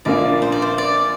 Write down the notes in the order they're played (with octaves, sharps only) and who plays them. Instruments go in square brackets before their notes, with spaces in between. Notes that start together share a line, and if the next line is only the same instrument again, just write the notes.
[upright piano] A#1 A#2 A#3 D4 [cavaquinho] D5
[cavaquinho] C5
D5
C5
D5